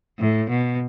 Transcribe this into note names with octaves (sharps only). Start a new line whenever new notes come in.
A2
B2